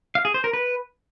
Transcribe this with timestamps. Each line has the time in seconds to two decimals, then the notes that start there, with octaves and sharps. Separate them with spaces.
0.15 F5
0.25 G#4
0.34 C5
0.44 A#4
0.53 B4